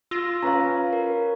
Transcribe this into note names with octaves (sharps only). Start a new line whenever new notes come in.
F4 E6 A#6
C#4 B4 F5 A#5
A#4